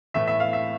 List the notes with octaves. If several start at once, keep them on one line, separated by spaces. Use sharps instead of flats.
A2 E3 A3 E5
E5
F5
E5